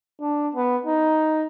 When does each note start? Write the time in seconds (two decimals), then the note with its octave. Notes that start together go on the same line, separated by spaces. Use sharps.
0.21 D4
0.55 B3
0.85 D#4